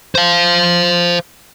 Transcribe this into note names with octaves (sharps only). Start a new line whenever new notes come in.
C5 F5